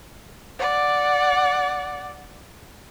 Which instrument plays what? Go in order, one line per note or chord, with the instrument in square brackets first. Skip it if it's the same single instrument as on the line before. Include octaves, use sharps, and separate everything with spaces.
[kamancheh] D5 F#5